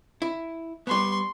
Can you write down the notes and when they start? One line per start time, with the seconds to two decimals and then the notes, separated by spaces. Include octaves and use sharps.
0.22 E4
0.87 G3 B3 C6 C#6